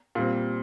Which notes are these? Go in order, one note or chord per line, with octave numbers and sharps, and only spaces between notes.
A#2 G3 C4